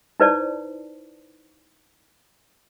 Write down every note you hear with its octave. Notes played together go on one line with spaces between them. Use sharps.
D#4 E4 B4 C5 D5 A5